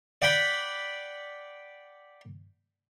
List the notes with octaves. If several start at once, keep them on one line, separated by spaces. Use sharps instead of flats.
D5 F#5 G5 B5